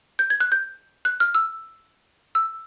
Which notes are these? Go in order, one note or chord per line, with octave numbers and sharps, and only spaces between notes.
G6
G#6
F#6
G6
F#6
F6
E6
E6